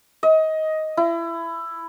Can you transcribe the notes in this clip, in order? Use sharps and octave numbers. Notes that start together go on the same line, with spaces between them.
D#5
E4